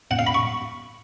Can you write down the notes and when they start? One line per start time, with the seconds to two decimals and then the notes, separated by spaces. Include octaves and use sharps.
0.11 F#5
0.19 F5
0.27 B5
0.34 C#6